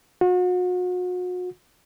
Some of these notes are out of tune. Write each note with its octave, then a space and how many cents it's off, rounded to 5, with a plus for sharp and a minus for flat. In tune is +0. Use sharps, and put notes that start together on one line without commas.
F#4 -40